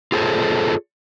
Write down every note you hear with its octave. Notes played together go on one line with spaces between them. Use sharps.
F4 G#4 A4 C5 C#5